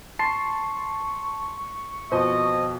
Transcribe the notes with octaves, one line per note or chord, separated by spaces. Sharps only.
A5 C6 C#6 C7
F2 B2 C5 D#5